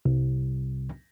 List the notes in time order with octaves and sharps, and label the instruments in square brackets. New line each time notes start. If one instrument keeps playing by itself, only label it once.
[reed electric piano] C2